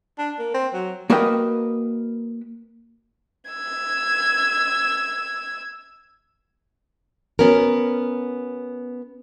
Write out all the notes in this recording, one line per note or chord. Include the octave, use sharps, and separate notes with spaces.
D4
A#3
C4
F#3
A#3 F#4 A#4 B4 D#5 G5
E6 G#6
B3 C#4 F#4 A#4